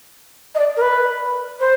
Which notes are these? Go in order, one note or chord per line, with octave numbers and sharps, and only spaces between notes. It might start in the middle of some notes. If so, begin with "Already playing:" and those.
D#5
D5
A#4
B4
C5